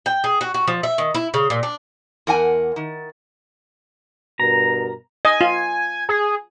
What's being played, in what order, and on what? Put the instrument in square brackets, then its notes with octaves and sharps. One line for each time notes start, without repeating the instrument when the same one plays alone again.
[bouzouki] G5
G#4
F#4
F#4
F3
E5
D#3
E4
C#3
A#2
D4
[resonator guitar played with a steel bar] E2 A#4 F#5 G#5
D#3
[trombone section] G2 B2 A#4 [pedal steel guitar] A#5
[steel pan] D#5 [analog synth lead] G#5
[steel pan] F4
[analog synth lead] G#4